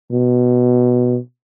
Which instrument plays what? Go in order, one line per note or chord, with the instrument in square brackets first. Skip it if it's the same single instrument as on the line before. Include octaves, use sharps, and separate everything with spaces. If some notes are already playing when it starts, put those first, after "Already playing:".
[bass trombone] B2